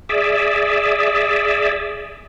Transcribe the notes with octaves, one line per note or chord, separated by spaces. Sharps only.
G#4 D5 E5